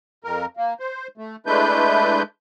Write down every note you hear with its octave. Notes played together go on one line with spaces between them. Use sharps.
F2 A#4
A#3
C5
A3
G#3 A3 D4 E4 B4 G6